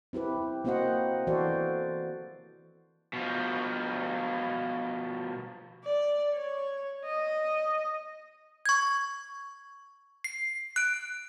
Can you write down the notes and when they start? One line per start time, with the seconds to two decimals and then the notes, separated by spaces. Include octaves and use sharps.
0.13 C4 E4 G4 B4
0.65 A#3 C4 F#4 C5 D#5 F#5
1.27 E3 F#4 A4 C5 D5
3.13 B2 F3
5.84 D5
6.34 C#5
7.05 D#5
8.66 C#6 G#6
10.24 C7
10.76 F#6 D7